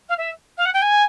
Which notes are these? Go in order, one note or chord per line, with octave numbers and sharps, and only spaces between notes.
F5
E5
F5
F#5
G5
G#5